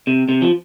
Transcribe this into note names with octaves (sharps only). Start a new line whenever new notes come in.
C3
C3
F3